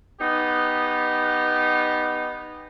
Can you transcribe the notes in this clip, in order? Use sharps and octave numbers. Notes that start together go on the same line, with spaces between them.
B3 D#4 G4